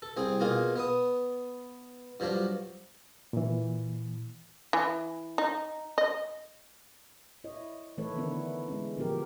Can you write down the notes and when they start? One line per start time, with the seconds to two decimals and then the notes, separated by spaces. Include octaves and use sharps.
0.02 A4
0.17 C2 C4 G#4
0.40 B2 A#3 F4 G#4
0.76 B3 B4 D#6
2.20 G2 F3 F#3 D4
3.33 A#2 E3
4.73 E3
5.38 D#4
5.98 D#5
7.44 E4 C#5 D#5
7.97 D#3 E3 A3 A4 B4 C#5
8.16 D3 E3 B3 D4 E4 A#4
8.68 G#3 C#4
8.96 D3 E3 F3 B3 G4 A#4